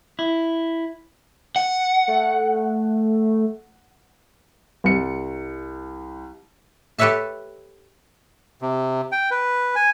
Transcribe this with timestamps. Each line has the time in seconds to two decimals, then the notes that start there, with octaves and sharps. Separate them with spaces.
0.19 E4
1.56 F#5
2.08 A3
4.84 C2 C#7
6.98 G4 A4 B4 C#5 E5 A5
8.62 C3
9.12 G5
9.31 B4
9.75 G#5